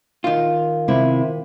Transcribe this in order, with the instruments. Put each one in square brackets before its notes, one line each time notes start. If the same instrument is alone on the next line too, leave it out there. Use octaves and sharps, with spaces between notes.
[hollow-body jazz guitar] D#3 F4
[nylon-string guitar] C3 E4